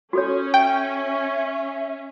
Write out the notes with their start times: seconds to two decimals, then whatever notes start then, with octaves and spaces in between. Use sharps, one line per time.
0.13 C#4 F#4 A4 C#5
0.54 E5 G5